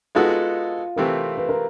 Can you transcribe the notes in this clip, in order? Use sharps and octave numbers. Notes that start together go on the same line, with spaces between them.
G#3 B3 D#4 F4 F#4 A4
C3 E3 A3 C4 A#4
B4
A#4